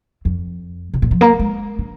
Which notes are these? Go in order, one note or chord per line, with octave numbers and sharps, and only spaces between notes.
F2
C3
A#2
F3
A#3
G#3
D3